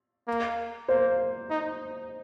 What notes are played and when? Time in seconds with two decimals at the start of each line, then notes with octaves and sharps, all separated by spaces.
0.28 A#3
0.88 A#3 C5
1.50 D#4